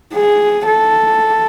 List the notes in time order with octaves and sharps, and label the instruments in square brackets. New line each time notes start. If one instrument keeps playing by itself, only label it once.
[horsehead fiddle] G#4
A4